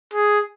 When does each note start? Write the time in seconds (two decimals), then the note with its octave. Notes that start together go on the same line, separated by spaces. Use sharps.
0.14 G#4